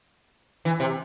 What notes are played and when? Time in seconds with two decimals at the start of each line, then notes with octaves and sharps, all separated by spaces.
0.65 E3
0.80 C3